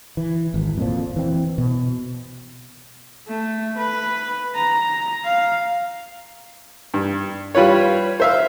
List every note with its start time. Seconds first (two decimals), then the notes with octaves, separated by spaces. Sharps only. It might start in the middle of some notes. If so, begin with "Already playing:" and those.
0.17 E3
0.54 G#1
0.78 F2 A#2 F3
1.16 E3 C4
1.58 B2
3.28 A3
3.78 B4
4.55 A#5
5.24 F5
6.94 G2
7.55 G3 F4 B4 C#5
8.20 C5 E5 F5